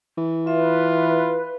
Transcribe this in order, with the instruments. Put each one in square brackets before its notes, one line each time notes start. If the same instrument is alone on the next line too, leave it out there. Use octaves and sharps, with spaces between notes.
[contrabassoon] E3
[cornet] F4 [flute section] B4 [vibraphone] E5